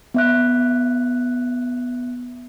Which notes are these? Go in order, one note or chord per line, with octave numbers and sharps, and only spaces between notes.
B3 E5 F#6